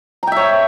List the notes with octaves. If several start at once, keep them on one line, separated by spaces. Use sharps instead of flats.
C#5 E5 G5 A#5